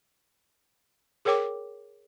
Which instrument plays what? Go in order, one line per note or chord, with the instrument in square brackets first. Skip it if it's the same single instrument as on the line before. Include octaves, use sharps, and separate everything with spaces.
[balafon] G#4 A#4 C#5 G5 D6